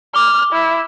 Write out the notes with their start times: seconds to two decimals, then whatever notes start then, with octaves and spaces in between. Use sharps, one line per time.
0.15 D6 F6 G7
0.52 E4